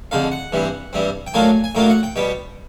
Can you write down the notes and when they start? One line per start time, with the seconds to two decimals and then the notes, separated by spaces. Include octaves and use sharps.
0.11 F2 D3 F3 G#3 F5
0.32 F#5
0.52 G2 E3 G3 C4
0.93 G2 E3 G3 C4
1.27 G5
1.34 A2 F#3 A#3 D4 F4 G#5
1.64 G#5
1.75 A2 F#3 A#3 D4 F4 G5
1.90 F#5
2.03 G5
2.16 B2 G3 B3 G5